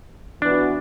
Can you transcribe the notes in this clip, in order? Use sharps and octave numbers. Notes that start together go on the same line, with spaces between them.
E3 B3 D4 F#4